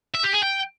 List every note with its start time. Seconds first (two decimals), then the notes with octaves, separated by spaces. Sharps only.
0.15 E5
0.24 G4
0.33 G#4
0.43 G5